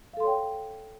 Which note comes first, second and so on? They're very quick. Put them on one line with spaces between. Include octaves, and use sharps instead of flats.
F5 A4 C6 C#5 G5